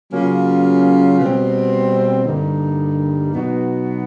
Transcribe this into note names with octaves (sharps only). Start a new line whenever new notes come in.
C#3 F#3 A#3 C#4 F4
B2 G3 C4
G2 D3 G3 A#3 D#4
B2 F#3 B3 D#4 F#4